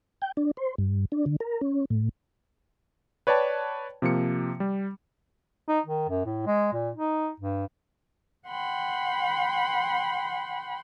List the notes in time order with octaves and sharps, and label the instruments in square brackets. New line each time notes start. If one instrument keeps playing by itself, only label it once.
[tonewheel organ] G5
D4
C5
G2
D4
D3
A#4
C#4
A2
[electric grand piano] B4 C#5 D5 G5 A5
C3 F3 A#3 C#7
G3
[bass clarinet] D#4
D#3
F#2
A2
G#3
A#2
D#4
G2
[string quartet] F#5 G5 B5 C6